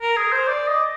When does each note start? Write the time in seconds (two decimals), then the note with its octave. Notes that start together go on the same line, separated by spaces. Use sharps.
0.02 A#4
0.17 G#4
0.32 C5
0.47 D5
0.68 D#5